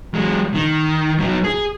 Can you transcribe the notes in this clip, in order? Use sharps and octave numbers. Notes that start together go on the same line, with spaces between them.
F#3 G#3
D#3
F#3 D#4
G#4